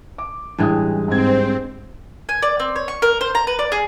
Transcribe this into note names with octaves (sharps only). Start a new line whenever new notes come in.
D6
A1 G2 E3 G#3 G5 D#6
G#2 C4 G#6
G#5
D5
C4
C#5
C#6
A#4
C5
A#5
B4
D5
G#4